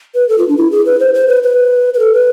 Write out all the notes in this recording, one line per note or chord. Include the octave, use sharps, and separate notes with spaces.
B4
A4
F4
D4
E4
G#4
B4
C5
C5
B4
B4
B4
A4
B4